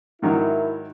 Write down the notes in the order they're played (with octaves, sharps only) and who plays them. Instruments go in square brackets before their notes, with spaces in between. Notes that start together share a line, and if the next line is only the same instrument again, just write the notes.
[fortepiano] G#2 D#3 F#3 [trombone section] E4 A#4